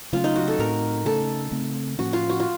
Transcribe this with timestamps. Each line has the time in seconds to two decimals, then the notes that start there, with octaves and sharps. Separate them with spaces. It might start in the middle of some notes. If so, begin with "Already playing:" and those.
0.13 C#3 F#3 A3 C#4 F4
0.24 D#4
0.36 F#4
0.48 A4
0.59 A2 A3 C4 A#4
1.05 C#3 A3 C#4 A4
1.52 C#3 A3 C4
1.98 A2 F3 A#3 C#4 F#4
2.13 F4
2.29 F#4
2.40 F4